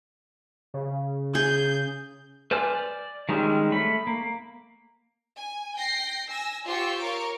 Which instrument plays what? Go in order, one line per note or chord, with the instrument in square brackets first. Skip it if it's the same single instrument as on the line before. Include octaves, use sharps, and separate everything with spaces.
[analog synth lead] C#3
[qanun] G#4 [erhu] G6
[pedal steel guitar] B4 C5 D5 G#5 F6
D5
D#3 G3 G#3 C4 C#4
A3 B5
A#3
[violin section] G#5
G5 A#6 C7
G#5 E6 A#6
F4 G4 C5 C6 C#6 E6
A#4 C#5 C#6 D6 D7